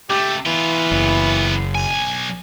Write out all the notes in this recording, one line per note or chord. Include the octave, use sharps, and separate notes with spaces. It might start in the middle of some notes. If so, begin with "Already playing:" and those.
C#2 A3 G4
E3 B3 F4
F#1
B1 G#5